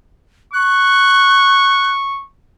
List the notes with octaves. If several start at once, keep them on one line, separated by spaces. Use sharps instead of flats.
C#6 F#6